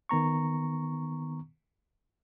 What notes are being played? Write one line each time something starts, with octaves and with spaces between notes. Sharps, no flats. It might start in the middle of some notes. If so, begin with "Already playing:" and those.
D#3 B3 A#5 C#6